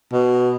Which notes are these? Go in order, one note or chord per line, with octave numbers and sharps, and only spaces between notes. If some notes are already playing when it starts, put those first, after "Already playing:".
B2